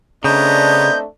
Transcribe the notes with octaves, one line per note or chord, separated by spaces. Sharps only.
C#3 A3 B3 C4 D4 D#5 A#5 G6